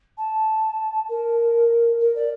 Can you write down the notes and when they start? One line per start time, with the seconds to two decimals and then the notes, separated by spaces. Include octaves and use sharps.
0.17 A5
1.09 A#4
2.00 A#4
2.16 D5